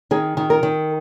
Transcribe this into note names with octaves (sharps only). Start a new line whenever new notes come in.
D#3 G#4
D#3
A#4
D#3